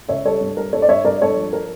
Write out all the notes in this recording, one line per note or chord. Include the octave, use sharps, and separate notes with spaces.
C#2 C#5 E5
G3 A4 C#5
G2
G3 A#4
G2 A4 C#5
D5
G2 C#5 E5
G2 A#4 D5
G2 A4 C#5
F3
A#4